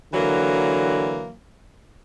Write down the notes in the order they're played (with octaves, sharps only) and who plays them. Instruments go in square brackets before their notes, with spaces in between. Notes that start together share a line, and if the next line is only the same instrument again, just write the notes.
[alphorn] D3 [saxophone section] E3 F#3 A#3